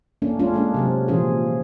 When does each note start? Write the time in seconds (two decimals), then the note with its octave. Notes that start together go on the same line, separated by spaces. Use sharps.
0.22 A3 A#3 C#4 D4
0.39 G#3 C#4 D4 F4
0.54 G#3 A#3 D4
0.74 C3 F#3 C4
1.08 A#2 E3 F3 C#4 F4 G#4